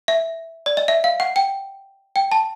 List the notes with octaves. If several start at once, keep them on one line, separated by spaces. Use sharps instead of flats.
E5
D5
D#5
E5
F5
F#5
G5
G5
A5